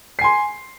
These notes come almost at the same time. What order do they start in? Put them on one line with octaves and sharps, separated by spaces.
C7 G#5 C6